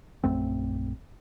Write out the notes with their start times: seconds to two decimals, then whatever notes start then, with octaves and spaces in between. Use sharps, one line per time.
0.24 A#1 F#2 A3 C4